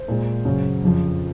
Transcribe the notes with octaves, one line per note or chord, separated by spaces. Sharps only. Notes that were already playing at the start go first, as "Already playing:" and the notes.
Already playing: C5
A#2 G#3
F#2 C#3 F#3
F2 C#3 F3